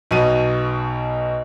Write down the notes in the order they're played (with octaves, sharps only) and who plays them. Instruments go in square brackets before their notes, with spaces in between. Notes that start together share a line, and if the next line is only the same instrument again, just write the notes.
[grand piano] B1 B2 D#7